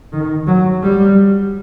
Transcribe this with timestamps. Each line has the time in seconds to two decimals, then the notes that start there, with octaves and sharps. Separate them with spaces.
0.12 D#3
0.47 F#3
0.83 G3